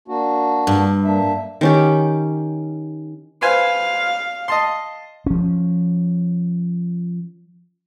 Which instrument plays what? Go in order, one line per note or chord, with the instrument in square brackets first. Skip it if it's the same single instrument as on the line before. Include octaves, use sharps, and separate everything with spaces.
[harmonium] A#3 D4 F#4
[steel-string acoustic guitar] G2
[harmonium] A#3 D4 E5
[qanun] D#3 C#4 G4
[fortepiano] B4 C5 G#5 [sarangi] F5
[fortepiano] D#5 A5 C6
[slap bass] F3 C#4